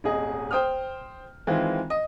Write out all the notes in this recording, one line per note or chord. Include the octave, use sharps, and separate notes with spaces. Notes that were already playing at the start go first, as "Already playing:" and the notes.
D#1 G#1 G#4 D#5
C5 G5 D#6 F6
D#3 E3 G#3 C4 F4
D#5